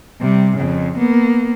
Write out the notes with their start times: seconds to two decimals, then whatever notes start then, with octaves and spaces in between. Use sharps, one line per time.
0.20 C3 G3
0.57 F2 C#3
0.98 A#3 B3